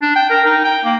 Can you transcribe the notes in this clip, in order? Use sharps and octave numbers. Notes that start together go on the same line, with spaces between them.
D4
G5
A#4
D#4
G5
A#3